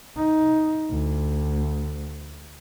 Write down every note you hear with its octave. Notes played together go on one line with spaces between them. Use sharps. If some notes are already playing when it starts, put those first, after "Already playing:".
D#4
D2